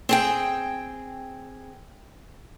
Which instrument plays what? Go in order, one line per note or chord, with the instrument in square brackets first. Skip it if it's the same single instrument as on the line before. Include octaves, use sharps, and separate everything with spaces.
[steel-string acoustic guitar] C4 G#4 G5